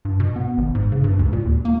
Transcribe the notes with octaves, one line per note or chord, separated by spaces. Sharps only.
G2
B2
B3
G#1
G#2
C#3
G2
D2
A#2
D#2
A#3